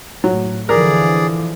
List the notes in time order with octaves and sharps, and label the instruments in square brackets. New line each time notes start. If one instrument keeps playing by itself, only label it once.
[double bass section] A2 [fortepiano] F#3
[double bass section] D3 E3 F3 [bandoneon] G#4 D5 [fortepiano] A#4